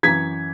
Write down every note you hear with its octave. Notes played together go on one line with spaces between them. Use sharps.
F#2 E3 G#6 B6